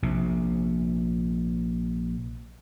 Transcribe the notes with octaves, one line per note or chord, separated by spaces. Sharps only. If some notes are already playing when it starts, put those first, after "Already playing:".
A#1 C3